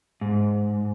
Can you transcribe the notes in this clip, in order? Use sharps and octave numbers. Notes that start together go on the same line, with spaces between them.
G#2